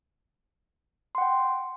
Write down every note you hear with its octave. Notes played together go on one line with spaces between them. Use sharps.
F#5 G5 C6